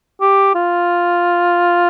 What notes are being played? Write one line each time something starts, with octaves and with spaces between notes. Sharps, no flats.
G4
F4